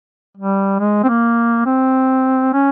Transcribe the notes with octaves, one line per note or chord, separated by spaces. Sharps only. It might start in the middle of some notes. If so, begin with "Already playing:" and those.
G3
G#3
C4
A#3
C4
C#4